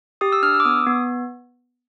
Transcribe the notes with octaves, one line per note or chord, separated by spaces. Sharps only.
G4 D#6
E6
D4 F6
E6
D6
B3 D#6
B3